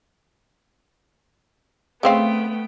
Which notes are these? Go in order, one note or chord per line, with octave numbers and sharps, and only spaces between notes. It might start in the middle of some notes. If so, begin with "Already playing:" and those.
C#3 A3 B3 C4 F5 G5